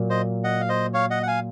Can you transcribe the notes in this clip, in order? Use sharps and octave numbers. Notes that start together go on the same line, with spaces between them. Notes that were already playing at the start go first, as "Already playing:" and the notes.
Already playing: A#2 F#3 A#3
C5 D#5
D#5 F#5
F5
C5 D#5
C#5 F5
D#5 F#5
F#5
F5 G#5